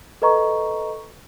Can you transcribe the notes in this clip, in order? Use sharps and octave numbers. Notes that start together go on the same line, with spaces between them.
A4 B4 D#5 A#5 C#6